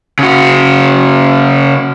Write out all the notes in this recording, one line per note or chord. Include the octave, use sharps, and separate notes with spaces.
C#3 F#4